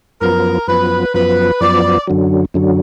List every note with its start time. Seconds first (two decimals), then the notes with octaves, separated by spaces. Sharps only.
0.21 F#2 F3 B3 A#4
0.68 F#2 F3 B3 B4
1.14 F#2 F3 B3 B4
1.61 F#2 F3 B3 D5
2.07 F#2 D3 F#3
2.54 F#2 D3 F#3